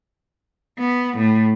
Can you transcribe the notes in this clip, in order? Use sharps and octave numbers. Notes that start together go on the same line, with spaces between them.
B3
A2